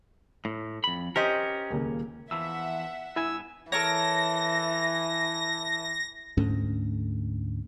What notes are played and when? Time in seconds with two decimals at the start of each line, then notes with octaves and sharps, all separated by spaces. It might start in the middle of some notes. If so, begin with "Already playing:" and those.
0.45 A2
0.84 F2 B5
1.16 C#4 G4 A#4 C5 D#5
1.70 D#1 C#2 A#3
2.31 E2 E3 F3 E5 F#5 E6
3.16 G2 B3 E4 G#5 E6
3.72 E3 A4 A#4 C#5 A#6
6.37 D2 G#2 A3 C#4